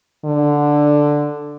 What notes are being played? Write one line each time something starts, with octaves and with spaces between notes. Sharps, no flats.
D3